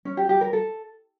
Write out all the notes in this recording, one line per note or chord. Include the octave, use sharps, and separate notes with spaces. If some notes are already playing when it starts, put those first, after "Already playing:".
C#4
G4
G4
A#4
A4